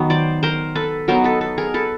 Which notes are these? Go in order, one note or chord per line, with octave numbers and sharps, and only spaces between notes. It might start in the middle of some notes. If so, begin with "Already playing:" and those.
Already playing: D#3 F#3 B3
C5 D5
A#4 C5
A4 B4
F#3 B3 D#4 A#4 C5
A4 B4
A4 B4
G#4 A#4
A4 B4